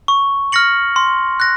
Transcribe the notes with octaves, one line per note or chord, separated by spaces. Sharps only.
C#6
F6 A#6 C#7 F#7
C6
F#6 A#6